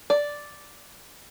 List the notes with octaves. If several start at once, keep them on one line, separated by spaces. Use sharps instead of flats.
D5